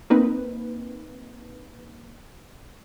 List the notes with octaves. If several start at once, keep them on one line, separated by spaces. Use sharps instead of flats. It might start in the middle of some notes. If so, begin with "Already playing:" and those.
A#3 C4 D#4 B4